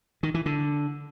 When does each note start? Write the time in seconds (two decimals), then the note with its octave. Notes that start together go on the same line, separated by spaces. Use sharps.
0.23 D#3
0.34 E3
0.46 D3